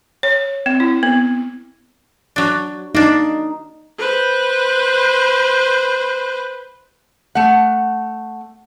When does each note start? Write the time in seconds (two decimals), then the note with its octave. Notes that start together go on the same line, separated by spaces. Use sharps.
0.23 C#5
0.66 C4
0.80 E4
1.03 B3
2.36 F#3 D4
2.95 A#3 D4 D#4
3.98 B4 C5
7.35 A3 F#5